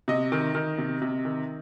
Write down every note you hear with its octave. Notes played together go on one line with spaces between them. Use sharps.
C3 D#5
D#3
D#3
C3
C3
D#3